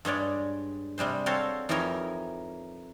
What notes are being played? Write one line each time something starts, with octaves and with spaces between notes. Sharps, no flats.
G2 G#3 C#5 D5
C3 G3 G#3 C5
C4 F#4 A4 C#5 F5
F2 E3 D#4 G4 A#4 C#5